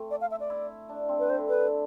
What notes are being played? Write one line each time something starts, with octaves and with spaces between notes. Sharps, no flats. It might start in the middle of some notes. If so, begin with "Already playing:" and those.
Already playing: A3 C4
D5
F5
E5
D5
E4
D4
C4
B4
D3 C5
B4